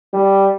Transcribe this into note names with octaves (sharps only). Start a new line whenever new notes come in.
G3